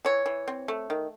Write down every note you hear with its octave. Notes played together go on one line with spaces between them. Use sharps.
E3 C#5
E3
C4
A3
D#3